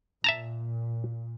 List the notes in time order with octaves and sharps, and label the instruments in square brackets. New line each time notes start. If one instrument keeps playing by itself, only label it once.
[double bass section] A#2 [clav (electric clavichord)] E5 A5 A#5